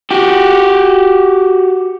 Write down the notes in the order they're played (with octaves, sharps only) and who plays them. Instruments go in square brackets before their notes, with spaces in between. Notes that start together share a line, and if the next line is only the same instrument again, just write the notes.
[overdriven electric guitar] F#4 G4